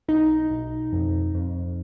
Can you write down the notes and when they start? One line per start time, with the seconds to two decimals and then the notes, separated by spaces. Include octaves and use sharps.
0.08 B1 D#4
0.51 B1
0.93 F2
1.35 F2